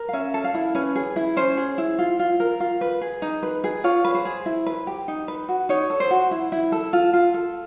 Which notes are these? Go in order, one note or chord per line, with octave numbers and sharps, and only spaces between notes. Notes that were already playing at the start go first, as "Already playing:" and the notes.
Already playing: A#4
F5
C#4 E5
A4
F5
E4
C#4 B4
G#4
E4
C#4 C5
G#4
E4
F4
F4
A#4
F4
B4
G#4
D#4
B4
G#4
F4 C#5
B4
C5
G#4
E4
B4
G4
D#4
B4
F#4
D#4 C#5
A4
C5
F#4
E4
E4
A4
F4
F4
A4